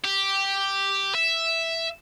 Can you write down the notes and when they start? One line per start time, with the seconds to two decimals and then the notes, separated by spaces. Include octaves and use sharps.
0.05 G4
1.15 E5